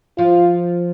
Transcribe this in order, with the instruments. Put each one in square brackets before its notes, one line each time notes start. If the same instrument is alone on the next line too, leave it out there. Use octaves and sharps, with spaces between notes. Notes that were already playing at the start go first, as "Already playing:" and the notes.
[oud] F3 [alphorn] F4